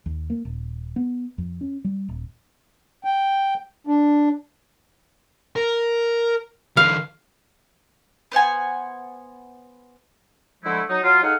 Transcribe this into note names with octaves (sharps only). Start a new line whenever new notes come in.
D#2
A#3
D#1
B3
F2
C#4
G3
D#1
G5
D4
A#4
D3 E3 F5
B3 C5 F#5 G#5
D3 F3 G#3 A3 E4
F#3 D#4
F#3 F4
D#4 G#4 A4 F5 F#5